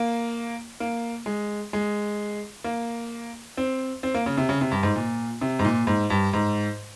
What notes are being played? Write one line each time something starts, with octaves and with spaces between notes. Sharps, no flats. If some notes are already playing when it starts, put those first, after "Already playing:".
Already playing: A#3
A#3
G#3
G#3
A#3
C4
C4
A#3
C#3
C3
C#3
C3
G2
G#2
A#2
C3
G#2
A#2
G#2
G2
G#2